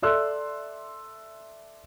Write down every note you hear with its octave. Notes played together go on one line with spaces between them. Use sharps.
A4 D5 E5 C6 E6 F#6